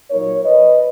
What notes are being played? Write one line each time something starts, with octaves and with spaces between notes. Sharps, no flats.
A#2 F#3 A#3 D#4 A#4 C#5
B4 D#5